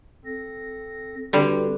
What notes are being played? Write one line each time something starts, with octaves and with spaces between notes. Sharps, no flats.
C4 A4 A#6
D3 G3 C4 F#4 B4